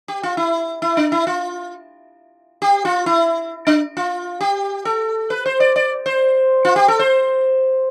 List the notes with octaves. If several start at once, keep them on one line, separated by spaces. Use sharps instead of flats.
G4
F4
E4
E4
D4
E4
F4
G4
F4
E4
D4
F4
G4
A4
B4
C5
D5
D5
C5
F4
G4
A4
C5